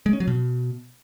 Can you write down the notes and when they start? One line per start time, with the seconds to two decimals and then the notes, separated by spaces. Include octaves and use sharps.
0.06 G#3
0.13 C#4
0.20 F#3
0.27 B2